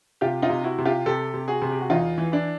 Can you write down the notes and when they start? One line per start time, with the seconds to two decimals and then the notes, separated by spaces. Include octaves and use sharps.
0.21 C3 F4 G4
0.42 D#4 F4
0.50 C3
0.64 E4 F#4
0.78 C3
0.85 F4 G4
1.06 C3 G4 A4
1.34 C3
1.48 F#4 G#4
1.62 C3
1.71 G4
1.81 F#4
1.90 E2 D#4 F4
2.18 E3
2.32 D4 E4